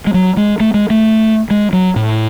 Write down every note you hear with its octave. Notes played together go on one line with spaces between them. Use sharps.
G#3
F#3
G#3
A3
G#3
A3
G#3
F#3
A2